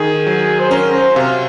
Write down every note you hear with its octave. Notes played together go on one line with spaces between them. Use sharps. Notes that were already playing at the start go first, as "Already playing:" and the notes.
Already playing: D#3 G#4
F#3
C5
C#4 A#4
C5
C3 F5